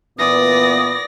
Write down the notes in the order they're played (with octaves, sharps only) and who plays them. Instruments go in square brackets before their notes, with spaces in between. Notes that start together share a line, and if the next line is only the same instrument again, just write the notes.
[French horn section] A#2 B3 [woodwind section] E3 D#6 [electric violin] D5 A#6